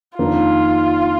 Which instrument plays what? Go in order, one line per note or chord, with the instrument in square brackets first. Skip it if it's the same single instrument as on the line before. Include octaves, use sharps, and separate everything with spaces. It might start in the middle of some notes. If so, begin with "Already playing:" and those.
[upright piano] F2 D#3 A#3 D4 [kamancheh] F4